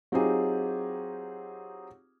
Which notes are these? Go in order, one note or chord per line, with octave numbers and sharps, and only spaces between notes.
F#3 C4 D#4 F4 G4 G#4